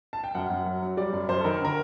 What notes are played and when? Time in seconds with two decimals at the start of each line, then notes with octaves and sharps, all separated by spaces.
0.13 A5
0.24 G5
0.35 F#2 F#5
0.50 F#2
0.66 F#3
0.82 F#3
0.97 G3 D5
1.13 F#2
1.29 F#2 C5
1.40 A4
1.45 D#3 A#4
1.60 D3 A#4